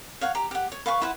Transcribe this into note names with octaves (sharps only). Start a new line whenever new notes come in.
C#5 F5 F#5
G4 A#5
G4 F#5
C#5
B4 F5 G#5 C#6
E4 B4 C5 F#5